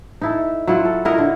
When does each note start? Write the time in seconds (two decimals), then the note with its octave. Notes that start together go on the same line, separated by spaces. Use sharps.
0.21 D#4 E4 A4
0.68 F#3 E4 F4
0.85 A4
1.05 E4 F#4 A#4 D#5
1.18 D3